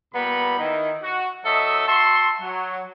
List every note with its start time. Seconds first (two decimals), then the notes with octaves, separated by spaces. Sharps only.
0.13 A#2 G3 B3 A#5 B5
0.58 D#3 D#4 E4
1.02 F#4
1.44 F#3 D#4 A4 D#5 E5
1.86 F#4 E5 A5 C6
2.40 F#3